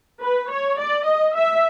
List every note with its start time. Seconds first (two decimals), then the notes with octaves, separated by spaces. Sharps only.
0.22 B4
0.50 C#5
0.79 D5
1.06 D#5
1.34 E5